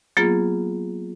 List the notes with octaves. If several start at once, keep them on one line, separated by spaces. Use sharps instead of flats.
F#3 A#3 B3 F4 G#4